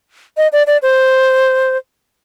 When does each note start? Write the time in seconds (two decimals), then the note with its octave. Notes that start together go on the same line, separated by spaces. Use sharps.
0.37 D#5
0.53 D5
0.67 D5
0.82 C5